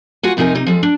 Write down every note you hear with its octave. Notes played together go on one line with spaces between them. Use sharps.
F4 F#4 F#5 G#5
F2 C3 D#4 G#4 A#4 G#5
C3 D#4
F3 G#3 A4
D4